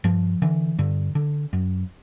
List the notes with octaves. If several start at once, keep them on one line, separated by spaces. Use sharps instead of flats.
G2 F3
D3 E3
G2 D3
D3
F#2